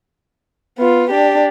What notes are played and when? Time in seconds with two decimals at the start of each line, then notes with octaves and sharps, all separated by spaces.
0.78 B3 F4
1.11 D4 G4